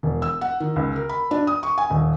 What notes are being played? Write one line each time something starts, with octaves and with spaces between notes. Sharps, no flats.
E1
E6
F#5
D#3
C#2
A#4
B5
D4
D#6
C#6
G#5
D#1